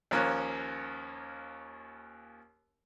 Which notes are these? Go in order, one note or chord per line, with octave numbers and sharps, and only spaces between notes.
D#2 F3 A#3 C#4 C#5 F#6